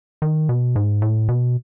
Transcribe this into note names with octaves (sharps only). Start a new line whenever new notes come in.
D#3
B2
G#2
A2
B2